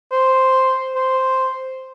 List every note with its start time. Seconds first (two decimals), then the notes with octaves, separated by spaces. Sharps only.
0.11 C5
0.96 C5